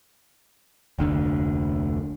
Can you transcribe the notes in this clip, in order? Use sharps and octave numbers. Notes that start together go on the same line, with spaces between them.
F1 D2 D3